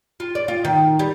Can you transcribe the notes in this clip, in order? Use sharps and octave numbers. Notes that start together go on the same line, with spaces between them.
F4
D5
F4
D#3
G3